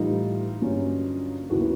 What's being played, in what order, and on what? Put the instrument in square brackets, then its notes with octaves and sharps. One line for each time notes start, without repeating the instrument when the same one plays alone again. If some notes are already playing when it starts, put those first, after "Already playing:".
Already playing: [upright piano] A2 E3 G3 D#4 F4
G2 D3 F#3 A#3 C#4
D#2 C#3 F#3 B3 E4 F#4